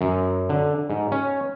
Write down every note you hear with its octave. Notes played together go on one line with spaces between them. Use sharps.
F#2
D3
G#2
C#4